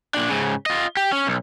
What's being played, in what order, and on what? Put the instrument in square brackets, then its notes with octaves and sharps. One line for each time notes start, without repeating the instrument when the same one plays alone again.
[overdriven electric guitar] A#2 D4
G#2 C#3
F4 D#5
G4
C#4
B1